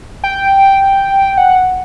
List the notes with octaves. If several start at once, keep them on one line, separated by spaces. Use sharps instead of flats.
G5
F#5